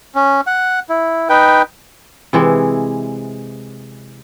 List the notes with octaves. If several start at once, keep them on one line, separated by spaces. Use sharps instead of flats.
C#4
F#5
E4
D#4 B4 G5
C3 E3 G#3